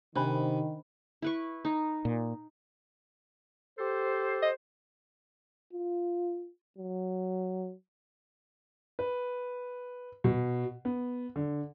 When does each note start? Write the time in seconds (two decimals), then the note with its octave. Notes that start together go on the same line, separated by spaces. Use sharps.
0.16 C3 D#3 D4 C5 B5
1.22 E4 B4 C#6
1.65 D#4
2.05 A#2
3.78 G4 A4 C5
4.43 D#5
5.73 F4
6.78 F#3
8.99 B4
10.24 B2
10.85 B3
11.36 D3